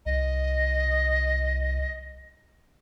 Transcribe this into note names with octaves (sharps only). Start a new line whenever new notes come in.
C2 D#5